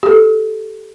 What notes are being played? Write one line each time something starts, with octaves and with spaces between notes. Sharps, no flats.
G4 A4